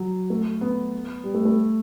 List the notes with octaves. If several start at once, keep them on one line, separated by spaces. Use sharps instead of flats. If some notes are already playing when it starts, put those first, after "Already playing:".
Already playing: F#3
A3
B3
G3
A3
A3